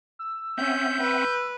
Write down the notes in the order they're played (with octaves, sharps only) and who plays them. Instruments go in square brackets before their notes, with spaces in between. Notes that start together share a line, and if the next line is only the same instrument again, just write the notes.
[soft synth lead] E6
[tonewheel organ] C4 E5 F#5 [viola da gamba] C#4 [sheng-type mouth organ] G6
[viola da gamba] B4